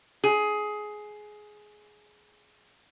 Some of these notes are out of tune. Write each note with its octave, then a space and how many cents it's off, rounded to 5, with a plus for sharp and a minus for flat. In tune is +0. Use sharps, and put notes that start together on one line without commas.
G#4 +15